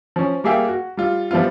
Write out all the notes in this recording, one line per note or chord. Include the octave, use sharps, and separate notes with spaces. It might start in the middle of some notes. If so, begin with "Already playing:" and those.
F3 C#4
G3 A#3 G#4 E5 F5 G5
F#4
G3 F4
F3 G3 B3 E4 F4